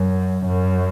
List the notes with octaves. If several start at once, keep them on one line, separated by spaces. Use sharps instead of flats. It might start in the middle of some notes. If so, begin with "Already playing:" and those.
Already playing: F#2
F#2